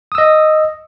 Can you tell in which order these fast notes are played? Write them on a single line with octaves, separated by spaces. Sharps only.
D#6 E6 D#5